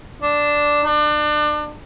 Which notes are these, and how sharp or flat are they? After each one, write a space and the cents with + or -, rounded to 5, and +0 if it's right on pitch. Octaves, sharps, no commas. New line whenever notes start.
D4 +0
D4 +30